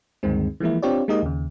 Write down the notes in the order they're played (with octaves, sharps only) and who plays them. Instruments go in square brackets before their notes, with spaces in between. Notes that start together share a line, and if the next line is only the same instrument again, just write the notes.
[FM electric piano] D2 G2 D#3 G#3 C4
E3 F3 G#3 A#3 E4
C4 D4 F4 G4 C#5 D5
G#3 A#3 D#4 G4 D#5
D#2 C#3